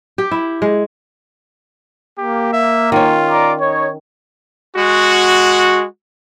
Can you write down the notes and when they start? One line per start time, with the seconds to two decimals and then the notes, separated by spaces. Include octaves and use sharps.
0.18 G4
0.31 E4
0.62 G#3
2.18 A#3 G4
2.53 E5
2.92 D#3 C#4 F4
3.30 D5 A#5 D6
3.59 D#4 C#5
4.76 G#3 F#4